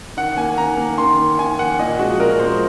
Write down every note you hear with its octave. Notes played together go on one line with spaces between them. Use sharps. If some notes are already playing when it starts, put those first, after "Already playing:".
D#3 F#5
A#3 G#5
D#3 A#5
A#3
D#3 C6
A#3
D#3 G#5
A#3 F#5
A#2 D#5
F3 G#3 F#4
A#2 A#4
F3 G#3 C5